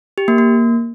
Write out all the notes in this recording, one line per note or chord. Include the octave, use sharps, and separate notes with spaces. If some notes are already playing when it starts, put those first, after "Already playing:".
G4
A#3
A#3